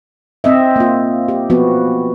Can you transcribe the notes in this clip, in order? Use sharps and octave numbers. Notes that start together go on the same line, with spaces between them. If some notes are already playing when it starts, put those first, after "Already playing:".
C4 D#5 E5
A#3 F4
G4
F3 B3 F#4